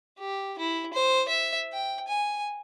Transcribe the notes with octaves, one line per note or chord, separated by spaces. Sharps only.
G4
E4
C5
E5
G5
G#5